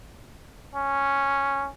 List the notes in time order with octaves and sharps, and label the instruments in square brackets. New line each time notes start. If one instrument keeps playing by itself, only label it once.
[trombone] C#4